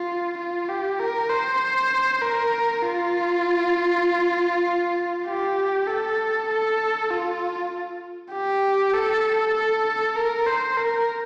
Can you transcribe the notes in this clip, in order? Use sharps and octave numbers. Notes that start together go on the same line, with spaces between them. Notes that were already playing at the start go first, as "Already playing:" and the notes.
Already playing: F4
F4
G4
A#4
C5
A#4
F4
G4
A4
A4
F4
G4
A4
A4
A#4
C5
A#4